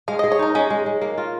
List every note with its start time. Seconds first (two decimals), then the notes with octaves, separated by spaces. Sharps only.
0.08 G#3 F5
0.19 G#4 D#5
0.32 C#5
0.39 D#4 A#4
0.55 G#3 C#4
0.70 G#3
0.86 G#3
1.02 A#3
1.18 F4